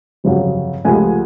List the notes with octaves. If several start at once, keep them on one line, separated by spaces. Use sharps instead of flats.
G1 F2 C#3 F#3
C#2 C3 F3 A3 F#5 G#5